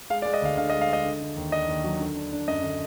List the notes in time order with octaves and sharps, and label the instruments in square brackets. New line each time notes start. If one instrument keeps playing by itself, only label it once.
[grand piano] G#3 F5
D5
G#3
D#5
D2 F5
D3 F5
D#5
G#3
F5
G#3 D#5
D3
D3
D#2
D4 D#5
D#2
F#3
D3
D4
D4
F#2 D#5
D3